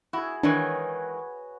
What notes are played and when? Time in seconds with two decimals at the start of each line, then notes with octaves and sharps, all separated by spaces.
0.13 E4 F#4 G#4
0.43 D#3 E3 G#3 D4 B4 C#5 G#5